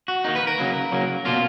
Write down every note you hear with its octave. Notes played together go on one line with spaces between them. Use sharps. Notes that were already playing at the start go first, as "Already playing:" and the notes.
F#4
D#3 A#3 D#4
B4
A#4
C#3 F#3 A#3
C#3 F#3 A#3
B2 A#3 F4